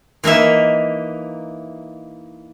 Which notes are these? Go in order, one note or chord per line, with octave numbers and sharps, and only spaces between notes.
E3 A#3 D#4 E5